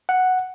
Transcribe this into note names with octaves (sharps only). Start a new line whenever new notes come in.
F#5